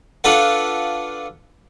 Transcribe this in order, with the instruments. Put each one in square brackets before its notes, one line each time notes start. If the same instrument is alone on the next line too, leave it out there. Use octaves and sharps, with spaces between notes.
[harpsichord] D4 F4 A4 B4 F#5